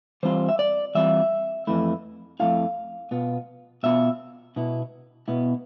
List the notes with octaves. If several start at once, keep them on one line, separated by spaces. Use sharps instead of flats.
E3 G3 C4 F4 C5
E5
D5
E3 G3 C4 F4 E5
F2 E3 A3 E4
F2 E3 A3 E4 F5
B2 B3 F4
B2 B3 F4 E5
B2 B3 E4
B2 B3 E4